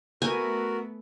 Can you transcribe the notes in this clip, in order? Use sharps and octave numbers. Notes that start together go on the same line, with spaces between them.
A3 B3 F#4 A#4 G#5